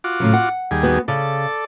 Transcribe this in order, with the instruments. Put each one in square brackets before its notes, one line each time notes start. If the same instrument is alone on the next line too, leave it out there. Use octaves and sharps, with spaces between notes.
[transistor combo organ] F4 F#4 D6
[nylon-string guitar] A2 C#3 F#3
F#5
[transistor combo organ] D#2 G3 G#4
[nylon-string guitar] B3 F#4
[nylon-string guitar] C#3 [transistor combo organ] A4 D5